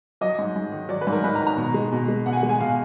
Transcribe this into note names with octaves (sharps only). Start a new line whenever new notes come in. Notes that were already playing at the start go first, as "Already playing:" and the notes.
F#3 D#5
G#2
G#2
D#3
F#3 D5
B4
G#2
A#4
G#2 B4
A#5
D#3
A#5
B2
G#3
B2
G#3
B2 F#5
G#5
F#5
G#3
G#5
B2 F5